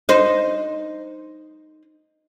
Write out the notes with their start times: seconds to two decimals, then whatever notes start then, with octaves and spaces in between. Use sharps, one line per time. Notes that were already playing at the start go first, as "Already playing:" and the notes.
0.09 D#4 C5